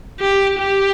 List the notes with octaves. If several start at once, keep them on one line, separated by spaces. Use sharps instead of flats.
G4
G4